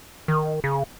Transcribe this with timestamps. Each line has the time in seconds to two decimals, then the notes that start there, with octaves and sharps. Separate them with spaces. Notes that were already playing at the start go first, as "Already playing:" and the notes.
0.28 D#3
0.64 C#3